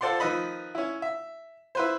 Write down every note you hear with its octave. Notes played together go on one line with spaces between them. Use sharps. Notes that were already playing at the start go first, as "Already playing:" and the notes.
F4 A4 C5 D5 F#5 C6
D#3 F3 B4 D#5 B5 E6
C#4 E4
E5
E4 B4 C5